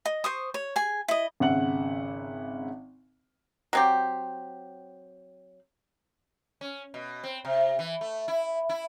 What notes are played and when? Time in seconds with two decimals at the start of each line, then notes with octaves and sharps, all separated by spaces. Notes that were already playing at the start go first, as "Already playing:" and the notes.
0.05 D#5
0.24 C5 C#6 D#6
0.54 C#5
0.76 G#4 G#5
1.08 E4 D#5
1.40 G#1 C#3 E5 F#5 F#7
3.73 F#3 C4 G4
6.61 C#4
6.94 B2
7.23 C4
7.45 C3
7.79 E3
8.01 A3
8.28 E4
8.69 E4